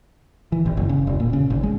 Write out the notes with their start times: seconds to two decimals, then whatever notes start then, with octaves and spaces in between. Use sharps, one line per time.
0.52 E3
0.66 G#1
0.77 F#1
0.89 C#3
1.07 E1
1.20 A#2
1.33 C#3
1.50 G#1
1.63 G#3